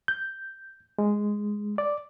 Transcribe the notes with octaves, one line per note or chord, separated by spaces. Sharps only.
G6
G#3
D5